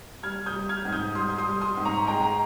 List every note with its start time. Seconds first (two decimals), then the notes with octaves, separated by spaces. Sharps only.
0.23 G3 F6 G#6
0.46 D#6 G6
0.54 G3
0.69 F6 G#6
0.85 G#2
0.93 D#6 G6
1.15 G3 C6 D#6
1.38 C6 D#6
1.47 G3
1.62 C6 D#6
1.77 G#2
1.85 A#5 C#6
2.07 G#3 G5 A#5
2.23 A#5